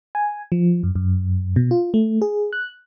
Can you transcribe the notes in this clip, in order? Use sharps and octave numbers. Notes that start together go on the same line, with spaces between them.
G#5
F3
F#2
F#2
B2
F4
A3
G#4
F#6